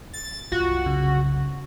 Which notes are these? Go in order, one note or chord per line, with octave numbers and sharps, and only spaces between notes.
A6
C2 F#2 F4 F#4
C#3